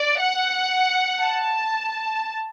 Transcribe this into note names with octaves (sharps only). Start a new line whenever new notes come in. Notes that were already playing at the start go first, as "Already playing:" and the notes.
Already playing: D5
F#5
A5